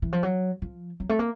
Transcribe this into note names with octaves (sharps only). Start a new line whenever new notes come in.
E3
F3
F#3
F3
F#3
A3
A#3